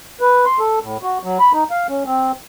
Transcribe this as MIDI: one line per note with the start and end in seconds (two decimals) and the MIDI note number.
0.21 0.45 71
0.46 0.59 84
0.59 0.79 69
0.82 0.97 45
1.03 1.18 66
1.23 1.38 54
1.39 1.52 83
1.53 1.64 63
1.71 1.87 77
1.88 2.03 61
2.06 2.32 60